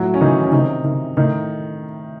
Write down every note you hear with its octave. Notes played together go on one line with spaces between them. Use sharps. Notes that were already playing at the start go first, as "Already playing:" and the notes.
Already playing: A2 F#3 F#4
C#4
D#3 E3 D#4
C#4
C3 D#3 D#4
D#3
A2 D#3 D#4